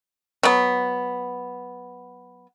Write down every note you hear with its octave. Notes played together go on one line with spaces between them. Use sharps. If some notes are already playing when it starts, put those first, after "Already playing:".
F#3 B3